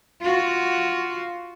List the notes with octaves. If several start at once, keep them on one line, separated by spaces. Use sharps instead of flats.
F4 F#4